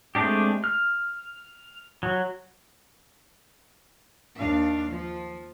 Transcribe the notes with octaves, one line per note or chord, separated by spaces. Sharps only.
G#3 A3 C4 D4 G4
F6
F#3
D#2 D4 F5
F3